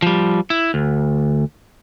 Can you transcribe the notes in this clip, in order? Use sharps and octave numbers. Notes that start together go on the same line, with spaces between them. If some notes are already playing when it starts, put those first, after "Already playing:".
F3 G3
E4
D2